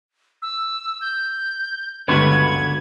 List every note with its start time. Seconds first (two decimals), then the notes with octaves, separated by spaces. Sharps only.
0.42 E6
1.01 G6
2.08 G1 C#2 D3 B3 F#4 B4 G#6